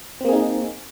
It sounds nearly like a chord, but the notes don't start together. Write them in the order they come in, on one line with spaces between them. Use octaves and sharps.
C4 A#3 G#4 D#4